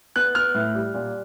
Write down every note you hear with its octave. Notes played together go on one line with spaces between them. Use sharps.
B3 F#6
B3 F6
A2
G3
A#2